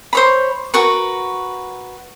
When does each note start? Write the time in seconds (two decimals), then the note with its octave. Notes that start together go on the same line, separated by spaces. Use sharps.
0.13 C5 C#5 B5
0.74 F#4 A#4 B4 C#6